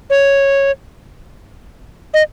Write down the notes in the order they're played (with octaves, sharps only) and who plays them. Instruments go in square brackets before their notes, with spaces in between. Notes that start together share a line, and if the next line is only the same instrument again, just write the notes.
[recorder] C#5
D#5